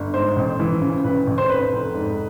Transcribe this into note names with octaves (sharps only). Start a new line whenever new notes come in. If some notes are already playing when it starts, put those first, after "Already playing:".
Already playing: G1
G#2 C5
A1
E3
C#3
A1 B4
A1
C5
F1 B4
F1
G#2